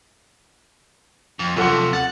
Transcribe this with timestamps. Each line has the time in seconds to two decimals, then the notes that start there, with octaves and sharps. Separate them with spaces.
1.39 F2
1.56 F#2 C3 F3 A4 F#5
1.93 F#5 A6